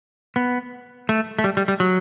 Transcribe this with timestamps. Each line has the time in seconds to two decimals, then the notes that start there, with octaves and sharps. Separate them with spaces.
0.36 B3
1.09 A3
1.39 A3
1.44 G3
1.57 G3
1.68 G3
1.80 F#3